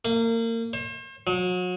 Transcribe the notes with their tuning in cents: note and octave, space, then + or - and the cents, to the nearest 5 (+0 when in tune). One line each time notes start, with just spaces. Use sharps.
A#3 -30
C5 +40
F#3 -35